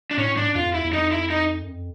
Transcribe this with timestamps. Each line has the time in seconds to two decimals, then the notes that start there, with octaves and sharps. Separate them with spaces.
0.11 D4
0.18 A2 C#4
0.37 G#2 D4
0.55 F2 F4
0.74 E2 E4
0.85 E2
0.93 F2 D#4
1.11 E4
1.30 D#4
1.62 F#2
1.68 F2